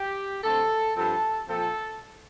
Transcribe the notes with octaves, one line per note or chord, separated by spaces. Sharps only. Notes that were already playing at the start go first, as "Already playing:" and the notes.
Already playing: G4
D3 A3 C4 A4
G2 F3 C4 A4
A#2 F3 C4 A4